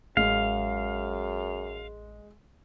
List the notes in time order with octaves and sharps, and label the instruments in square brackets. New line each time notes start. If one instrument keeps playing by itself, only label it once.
[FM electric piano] A1 [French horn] F#2 [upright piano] G#3 [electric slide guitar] F5